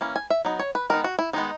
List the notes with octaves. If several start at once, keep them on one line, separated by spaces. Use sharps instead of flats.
E3 A#3 C#4
G#5
E5
F#3 B3 D#4
C#5
B4
D#3 G#3 B3 D#4 A#4
F#4
E4
D#3 G#3 B3 D#4